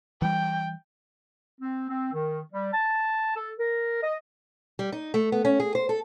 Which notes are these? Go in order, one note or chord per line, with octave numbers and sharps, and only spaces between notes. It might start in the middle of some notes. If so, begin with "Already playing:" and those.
E3 G3 G5
C4
C4
D#3
G3
A5
A4
A#4
D#5
G3
D#4
A3
B3
C#4
G#4
C5
A4